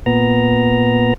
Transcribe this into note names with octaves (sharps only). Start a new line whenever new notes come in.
A#2 B3 A#5